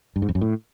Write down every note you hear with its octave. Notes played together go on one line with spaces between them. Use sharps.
G2
G#2
F2
F#2
A2